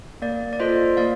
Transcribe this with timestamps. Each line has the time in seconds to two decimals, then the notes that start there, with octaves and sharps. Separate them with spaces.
0.22 A#3 D5
0.53 D5
0.60 F4 A4 C5 D#5
0.97 A#3 D5 F5